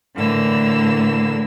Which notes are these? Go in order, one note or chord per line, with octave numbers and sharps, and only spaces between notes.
A2 D3 E3 A#3 E6